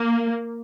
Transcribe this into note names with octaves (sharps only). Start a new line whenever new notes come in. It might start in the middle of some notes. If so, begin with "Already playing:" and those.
Already playing: A#3